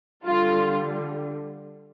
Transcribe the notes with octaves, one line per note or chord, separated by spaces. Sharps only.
D3 G3 F4